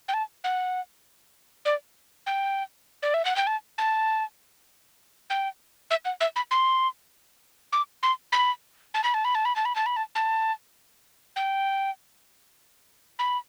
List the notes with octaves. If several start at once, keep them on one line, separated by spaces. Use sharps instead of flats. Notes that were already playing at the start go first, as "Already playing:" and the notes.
G5
A5
F#5
D5
G5
D5
E5
F#5
G5
A5
A5
G5
E5
F#5
E5
B5
C6
D6
C6
B5
A5
B5
A5
B5
A5
B5
A5
B5
A5
B5
A5
A5
G5
B5